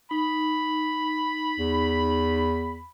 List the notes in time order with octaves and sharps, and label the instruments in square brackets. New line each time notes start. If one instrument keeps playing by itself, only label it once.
[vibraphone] D#4 [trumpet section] B5
[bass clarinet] E2